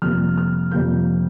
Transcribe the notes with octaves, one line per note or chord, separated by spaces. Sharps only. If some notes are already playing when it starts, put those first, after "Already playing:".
F2 C3 G3 A#3 F6
F6
F2 C3 G3 A#3 G6